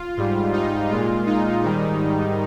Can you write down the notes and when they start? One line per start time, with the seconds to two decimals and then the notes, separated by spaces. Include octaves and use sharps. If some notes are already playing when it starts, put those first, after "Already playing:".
Already playing: F4
0.17 G#2 G3
0.53 D#4
0.90 A#2 G#3 F4
1.27 D#4
1.63 G#2 D#3 G3